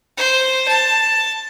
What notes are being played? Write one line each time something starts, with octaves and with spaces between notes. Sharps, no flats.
C5
A5